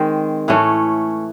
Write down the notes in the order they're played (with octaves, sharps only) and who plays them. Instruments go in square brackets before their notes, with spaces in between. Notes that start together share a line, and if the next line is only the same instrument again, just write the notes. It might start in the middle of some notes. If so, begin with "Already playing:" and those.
Already playing: [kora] D#3 G#3 C4
A2 E3 A3 C#4